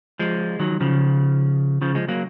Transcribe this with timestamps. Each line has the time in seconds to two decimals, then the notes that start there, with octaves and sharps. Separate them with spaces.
0.19 F3 G#3
0.60 D#3 F#3
0.81 C#3 F3
1.82 C#3 F3
1.95 F3 G#3
2.08 F#3 A#3